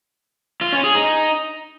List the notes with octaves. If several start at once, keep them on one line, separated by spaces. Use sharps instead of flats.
F4
C#4
G#4
D#4